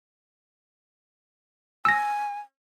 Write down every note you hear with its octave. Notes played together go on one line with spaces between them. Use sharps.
G#5 E6 A#6